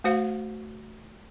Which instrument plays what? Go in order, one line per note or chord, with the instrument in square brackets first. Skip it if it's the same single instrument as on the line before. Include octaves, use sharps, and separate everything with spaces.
[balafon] A3 F#4 C5 F5